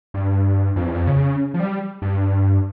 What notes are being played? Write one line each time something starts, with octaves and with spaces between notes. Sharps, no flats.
G2
F2
E2
F2
C#3
F3
G3
G2